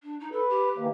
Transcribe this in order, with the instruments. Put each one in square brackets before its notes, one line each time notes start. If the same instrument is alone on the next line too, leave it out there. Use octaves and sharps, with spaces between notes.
[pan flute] D4
D#4
[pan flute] A4 [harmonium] B4
[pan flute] G4
[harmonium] D#3 E3 A#3